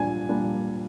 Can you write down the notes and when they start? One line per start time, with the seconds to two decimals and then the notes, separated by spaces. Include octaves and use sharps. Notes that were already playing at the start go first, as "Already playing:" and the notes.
Already playing: A#2 G3 D4 G#5
0.29 A#2 G3 A#3 D4